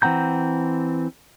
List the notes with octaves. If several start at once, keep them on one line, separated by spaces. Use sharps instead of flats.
E3 C4 F#5 A#5 G6